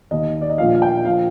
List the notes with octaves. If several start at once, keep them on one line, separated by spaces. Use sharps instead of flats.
D#2 D#3 D#5
D5
D#5
A#1 A#2 F3 F5
F5
G5
A#2 F3 F5